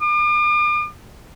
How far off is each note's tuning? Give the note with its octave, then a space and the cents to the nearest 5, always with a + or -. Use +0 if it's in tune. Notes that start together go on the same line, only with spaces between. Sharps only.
D6 +45